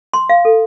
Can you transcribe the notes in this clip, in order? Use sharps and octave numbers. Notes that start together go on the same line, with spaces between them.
C6
F5
A4